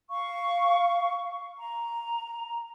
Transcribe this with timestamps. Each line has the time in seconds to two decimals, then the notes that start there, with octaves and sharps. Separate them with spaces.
0.10 F5 C#6
1.59 A#5